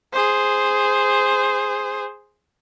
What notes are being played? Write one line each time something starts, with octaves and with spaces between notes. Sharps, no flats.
G#4 C5